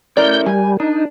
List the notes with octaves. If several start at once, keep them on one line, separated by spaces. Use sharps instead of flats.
A3 C#4 E4 A#4 D5 G6
G3 G#5
D4 D#4